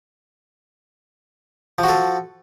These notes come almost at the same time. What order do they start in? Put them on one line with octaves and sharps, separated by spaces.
F3 F#4 A4